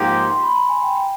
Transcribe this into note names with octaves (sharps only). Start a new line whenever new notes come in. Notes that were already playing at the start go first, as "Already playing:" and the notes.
Already playing: G#2 F3 A#3 D#4 G4 C6
C6
C6
B5
A#5
G#5
G5
G5